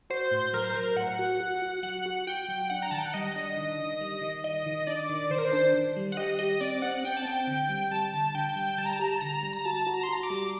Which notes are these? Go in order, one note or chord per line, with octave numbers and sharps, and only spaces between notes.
F#4 C5
A2
F#3 A#4
C5
F#3 A#4
A2 F#5
F#4
F#4
F#4
F#3 F#5
F#4
F#4 G5
F#3
D4 F#5
A#5
D#3 A5
G5
F#5
G3 D#5
D4
D#3
D#3
G3
D#3
D#3 D#5
D#3
D4 D5
D#3
D#3 C5
A#4
C5
D4
D#3
G3
F#5
G4 D#5
G4 D#5
C4 D5
C4 F#5
C4 G5
A5
C4 G5
D3
G3
G3 A5
D3 A5
D3 G5
G3 G5
G3 A5
A#5
A5
G4 A#5
A5
D3 A#5
G3
A#5
F#4 A5
F#4
A#5
C6
F#4 A#5
D6
G3